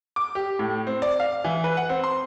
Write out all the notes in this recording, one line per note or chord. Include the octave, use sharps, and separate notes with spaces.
D6
G4
A2
C4
D5
F5
E3
B4
F#5
C4
C6